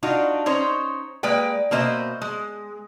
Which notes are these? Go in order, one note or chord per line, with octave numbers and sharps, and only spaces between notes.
D4 D#4 F4 F#4
C#4 D#4 C5 C#5
G#3 A#3 B4 D5 G5
B2 A#3 C5 D#5 E5
G#3